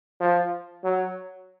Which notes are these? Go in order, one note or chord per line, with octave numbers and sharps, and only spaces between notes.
F3
F#3